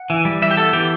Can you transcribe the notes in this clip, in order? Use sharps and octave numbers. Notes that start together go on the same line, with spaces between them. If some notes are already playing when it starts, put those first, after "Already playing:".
Already playing: F#5
E3
G3
E3 E5
G4
B3 A4
E3 G4